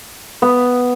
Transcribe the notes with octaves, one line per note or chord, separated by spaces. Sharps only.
B3